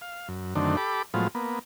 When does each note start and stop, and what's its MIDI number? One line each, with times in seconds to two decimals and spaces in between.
0.01 0.28 77
0.28 0.54 42
0.55 0.76 42
0.55 0.76 50
0.55 0.76 51
0.55 0.76 57
0.55 0.76 60
0.55 0.76 62
0.77 1.02 67
0.77 1.02 69
0.77 1.02 83
0.77 1.02 86
1.14 1.28 45
1.14 1.28 53
1.14 1.28 54
1.14 1.28 56
1.14 1.28 59
1.14 1.28 65
1.35 1.59 58
1.35 1.59 59